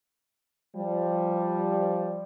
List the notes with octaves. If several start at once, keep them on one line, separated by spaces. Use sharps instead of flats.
F3 G3